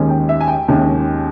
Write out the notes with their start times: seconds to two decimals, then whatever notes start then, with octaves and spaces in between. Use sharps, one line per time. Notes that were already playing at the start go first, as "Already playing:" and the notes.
Already playing: D#2 D#3 G#3 C#4
0.09 G5
0.29 E5
0.40 G#5
0.48 G5
0.68 D#2 D#3 G#3 C#4 G5